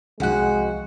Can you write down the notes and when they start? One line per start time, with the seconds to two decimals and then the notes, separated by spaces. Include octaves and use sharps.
0.20 C2 F2 G#3 F#4 F#5 F#6